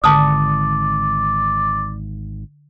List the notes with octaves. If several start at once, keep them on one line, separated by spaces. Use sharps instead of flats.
G#1 D3 D5 A5 D#6